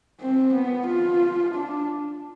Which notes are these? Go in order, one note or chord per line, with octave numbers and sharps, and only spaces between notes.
C4
B3
F4
D4